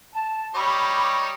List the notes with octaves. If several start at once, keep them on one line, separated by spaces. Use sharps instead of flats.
A5
G3 D#4 C#5 B5 D6